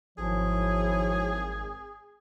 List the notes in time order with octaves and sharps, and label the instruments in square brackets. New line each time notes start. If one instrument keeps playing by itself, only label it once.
[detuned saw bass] G#1 [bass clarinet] F3 [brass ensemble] F#3 E4 C#5 [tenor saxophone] G#4